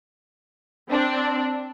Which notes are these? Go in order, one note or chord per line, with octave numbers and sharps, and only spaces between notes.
C4 D4